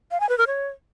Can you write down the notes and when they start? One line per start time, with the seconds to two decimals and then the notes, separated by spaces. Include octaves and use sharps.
0.11 F5
0.20 G#5
0.29 B4
0.38 A#4
0.47 C#5